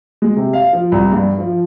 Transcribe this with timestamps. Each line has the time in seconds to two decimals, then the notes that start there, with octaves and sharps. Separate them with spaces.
0.22 G#3
0.37 C3
0.53 F5
0.73 F3
0.92 C2
1.12 G2
1.39 F3